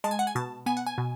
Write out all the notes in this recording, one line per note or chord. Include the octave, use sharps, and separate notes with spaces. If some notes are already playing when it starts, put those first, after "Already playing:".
G#3 A5
G#5
F#5
G#5
B2 A5
B3 G#5
F#5
G#5
B2